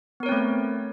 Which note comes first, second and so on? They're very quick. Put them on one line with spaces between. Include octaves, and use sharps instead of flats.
B3 A#4 C#5 C4 A3